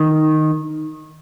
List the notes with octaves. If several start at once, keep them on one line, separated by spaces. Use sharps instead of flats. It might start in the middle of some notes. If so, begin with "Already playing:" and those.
Already playing: D#3